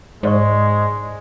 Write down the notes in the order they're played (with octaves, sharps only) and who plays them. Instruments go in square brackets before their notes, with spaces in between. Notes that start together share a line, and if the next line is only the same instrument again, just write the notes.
[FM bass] G#2 [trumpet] G#3 [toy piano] C5 D5 C#6